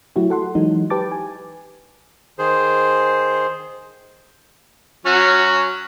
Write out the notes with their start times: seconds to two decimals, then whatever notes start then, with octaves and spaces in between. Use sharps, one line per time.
0.16 F#3 A3 E4 F#4 G4
0.30 A4 F#5 C6
0.55 E3 F#3 G#3 D#4
0.90 G4 B4 G5 A5 D6 A6
1.12 G#5
2.39 D#3 G#4 C5
5.06 F#3 C#4 F#4